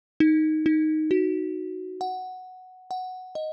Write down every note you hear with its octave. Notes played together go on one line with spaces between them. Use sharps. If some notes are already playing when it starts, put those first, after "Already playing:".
D#4
D#4
F#4
F#5
F#5
D#5